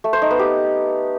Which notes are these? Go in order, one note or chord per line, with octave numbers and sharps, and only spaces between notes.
A3
C5
D#4
B3
G4